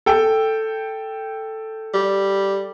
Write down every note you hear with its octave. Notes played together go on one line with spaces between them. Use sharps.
A4 G5
G3